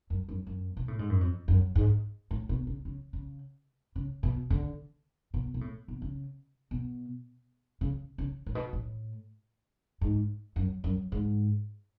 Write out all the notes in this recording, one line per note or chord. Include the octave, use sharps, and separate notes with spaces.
F#2
F#2
F#2
B2
A2
G#2
F#2
F2
F#2
G#2
A2
B2
C#3
C#3
C#3
C#3
B2
D3
B2
B2
A2
B2
C#3
B2
C#3
C#3
A2
B2
A2
G#2
F#2
F#2
G#2